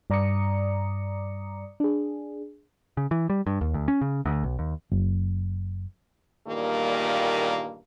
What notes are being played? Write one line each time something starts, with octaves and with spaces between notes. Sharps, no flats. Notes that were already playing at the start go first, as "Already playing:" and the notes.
G2 D5 A#5 D6 D#6 C#7
D4 G#4
C#3
E3
G3
G2
D#2
D2
C#4
C#3
D2
B1
D#2
F#1
E2 G2 A#2 D#3 G3 A#3